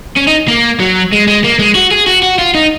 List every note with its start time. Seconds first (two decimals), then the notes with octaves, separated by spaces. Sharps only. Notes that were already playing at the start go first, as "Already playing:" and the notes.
0.17 C#4
0.28 D#4
0.48 A#3
0.80 F#3
1.12 G#3
1.27 G#3
1.44 A#3
1.59 G#3
1.75 F#4
1.91 G#4
2.07 F#4
2.23 F#4
2.39 F4
2.55 D#4